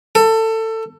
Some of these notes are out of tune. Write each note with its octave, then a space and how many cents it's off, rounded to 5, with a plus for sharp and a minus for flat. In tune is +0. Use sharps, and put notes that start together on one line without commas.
A4 +20